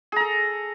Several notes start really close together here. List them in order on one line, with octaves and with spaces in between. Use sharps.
G#4 A#5 A4